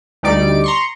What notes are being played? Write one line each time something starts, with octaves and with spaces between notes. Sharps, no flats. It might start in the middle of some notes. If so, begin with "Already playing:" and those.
D2 G3 D#4 D5 D7
A#5 C6 C#6